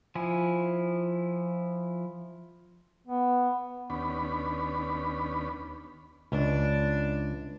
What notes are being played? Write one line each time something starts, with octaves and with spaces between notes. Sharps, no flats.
F3 E4 G#5
B3
D#2 B3 C#4 D4 B5
C#2 D4